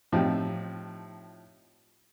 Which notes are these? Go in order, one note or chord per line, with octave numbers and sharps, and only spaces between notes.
A2 F3 C4 D#4 G4